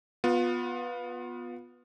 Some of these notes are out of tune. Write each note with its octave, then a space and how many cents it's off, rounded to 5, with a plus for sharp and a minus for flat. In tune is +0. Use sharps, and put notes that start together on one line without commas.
B3 -5 F4 +25